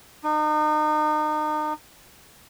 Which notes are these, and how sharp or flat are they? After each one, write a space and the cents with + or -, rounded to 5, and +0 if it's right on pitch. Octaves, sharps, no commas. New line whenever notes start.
D#4 -35